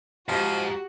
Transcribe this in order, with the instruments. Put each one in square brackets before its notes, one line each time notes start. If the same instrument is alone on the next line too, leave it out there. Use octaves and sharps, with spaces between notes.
[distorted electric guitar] D#2 G#2 [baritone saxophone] F3 [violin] F#4 [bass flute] G4